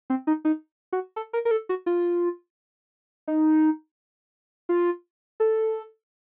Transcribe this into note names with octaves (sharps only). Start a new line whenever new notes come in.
C4
D#4
D#4
F#4
A4
A#4
A#4
A4
F#4
F4
D#4
F4
A4